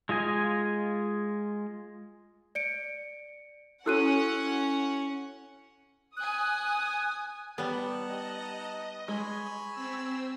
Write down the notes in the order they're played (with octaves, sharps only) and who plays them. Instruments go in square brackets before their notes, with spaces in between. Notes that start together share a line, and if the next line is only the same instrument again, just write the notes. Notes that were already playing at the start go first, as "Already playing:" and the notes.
[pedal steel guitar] G#3 F4 D#5 G#5
[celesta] D5 C#7 D7
[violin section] C#4 F#5 [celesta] E4 F#6 D#7 [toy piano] F#4 A4 E6
[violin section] G#5 D#6 [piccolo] F#6
[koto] G3 B3 [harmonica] D#4 F#5 A5
[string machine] D#5
[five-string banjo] G#3 [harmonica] C#5 G#5 B5
[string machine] C4 E6